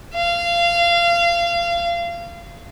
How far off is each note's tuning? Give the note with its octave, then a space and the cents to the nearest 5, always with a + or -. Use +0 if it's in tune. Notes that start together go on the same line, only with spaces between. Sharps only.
F5 -25